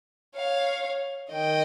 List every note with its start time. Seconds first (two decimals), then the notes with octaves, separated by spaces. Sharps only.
0.36 C#5 F5
1.32 D#3 D#5 G5